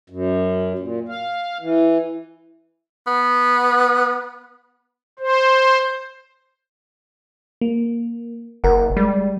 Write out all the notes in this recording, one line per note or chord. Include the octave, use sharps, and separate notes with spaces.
F#2
A#2
F5
E3
B3
C5
A#3
F#1 A#4 F#5
G3 G#3